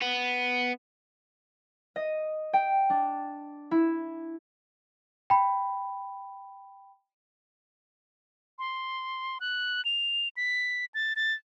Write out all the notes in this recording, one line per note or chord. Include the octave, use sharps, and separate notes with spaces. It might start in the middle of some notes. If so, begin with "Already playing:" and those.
B3
D#5
G5
D4
E4
G5 B5
C6
F#6
F7
B6
A6
A6